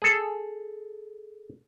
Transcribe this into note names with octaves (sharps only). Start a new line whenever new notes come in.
G#4 A4